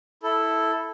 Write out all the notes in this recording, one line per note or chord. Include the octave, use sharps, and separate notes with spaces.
E4 A4